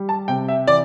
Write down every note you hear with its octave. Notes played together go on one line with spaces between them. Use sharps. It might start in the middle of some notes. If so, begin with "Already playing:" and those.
Already playing: G3
A5
C3 G5
E5
E3 D5